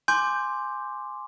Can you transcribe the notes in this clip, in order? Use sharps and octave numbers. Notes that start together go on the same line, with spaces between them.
G#5 C6 D6 G6